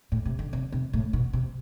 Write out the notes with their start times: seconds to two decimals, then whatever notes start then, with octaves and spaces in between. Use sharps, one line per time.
0.12 A2
0.25 C3
0.39 D3
0.53 C3
0.72 C3
0.93 A2
1.13 B2
1.33 C3